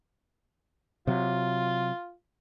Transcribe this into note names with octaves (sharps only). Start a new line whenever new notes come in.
C3 F#3 F4